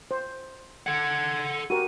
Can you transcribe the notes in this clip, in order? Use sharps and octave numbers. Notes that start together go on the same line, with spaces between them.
C5
A4 F#5 G#6
F#4 G4 A#4 D#7